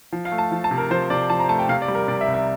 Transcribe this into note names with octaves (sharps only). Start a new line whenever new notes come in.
F3
F5
A3
A5
F3
A5
C3
A#4
F3 C5
C3 D5
F3 A5
A#5
A3 A5
G5
C3 F5
D5
G3
A#4
C3 D5
E5
C2
E5